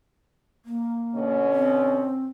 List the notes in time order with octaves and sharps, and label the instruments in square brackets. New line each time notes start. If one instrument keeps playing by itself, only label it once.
[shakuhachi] A#3
[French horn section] B2 D3 C#4
[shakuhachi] C4